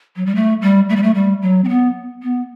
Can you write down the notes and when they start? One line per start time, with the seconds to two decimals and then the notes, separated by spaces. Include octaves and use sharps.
0.16 F#3
0.26 G3
0.35 A3
0.62 G3
0.89 A3
0.96 G3
1.03 A3
1.15 G3
1.42 F#3
1.64 C4
1.69 B3
2.23 B3